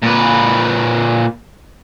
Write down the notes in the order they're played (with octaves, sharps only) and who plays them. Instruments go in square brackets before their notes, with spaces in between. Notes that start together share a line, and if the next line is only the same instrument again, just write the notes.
[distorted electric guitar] A#2 B4